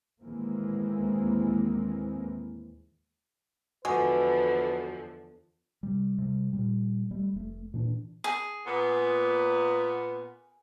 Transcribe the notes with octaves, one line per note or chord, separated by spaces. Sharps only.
D#2 A2 E3 G#3 A#3 C4
E2 D3 F3 G#3 F#4 B4 G#5 D6
C3 G3
C3 G3
A#2 G3
G3 A3
F1 A3
A#2 E3 D4
G#4
A#2 B3